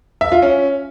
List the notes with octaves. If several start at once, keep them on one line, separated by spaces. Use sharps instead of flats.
E5
F4
C#4